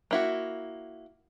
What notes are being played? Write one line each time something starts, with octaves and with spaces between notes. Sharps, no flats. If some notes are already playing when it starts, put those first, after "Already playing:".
A#3 E4 F#4